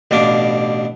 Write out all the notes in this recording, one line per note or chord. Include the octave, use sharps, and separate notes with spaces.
A1 B2 D4 F5 D6